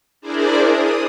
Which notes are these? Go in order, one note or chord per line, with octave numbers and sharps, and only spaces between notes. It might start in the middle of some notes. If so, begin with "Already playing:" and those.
D4 E4 G#4 A#4 C5 D5
D#6